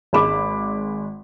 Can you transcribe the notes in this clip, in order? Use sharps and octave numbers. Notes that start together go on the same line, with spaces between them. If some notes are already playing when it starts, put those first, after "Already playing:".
G#1 G#3 B5 D6